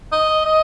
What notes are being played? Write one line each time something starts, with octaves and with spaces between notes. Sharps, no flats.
D#5
D#5